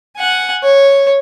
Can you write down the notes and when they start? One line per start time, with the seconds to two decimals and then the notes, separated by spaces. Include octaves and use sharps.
0.17 F#5 G#5
0.63 C#5